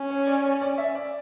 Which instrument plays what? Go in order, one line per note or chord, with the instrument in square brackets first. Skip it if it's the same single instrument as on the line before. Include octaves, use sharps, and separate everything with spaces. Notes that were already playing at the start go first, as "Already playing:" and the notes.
Already playing: [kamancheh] C#4
[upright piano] C#5
D5
C#5
D5
E5
D5